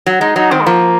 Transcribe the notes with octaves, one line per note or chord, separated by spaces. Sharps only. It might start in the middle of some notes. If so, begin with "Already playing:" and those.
F#3
G#3 D#4
F#3 D#4
D#3 C4
G#3
F3 A#3